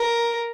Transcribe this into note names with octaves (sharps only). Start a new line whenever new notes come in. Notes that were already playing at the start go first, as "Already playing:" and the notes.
Already playing: A#4